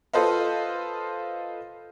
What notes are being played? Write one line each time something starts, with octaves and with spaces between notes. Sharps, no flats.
F4 A4 B4 C5 D#5 F5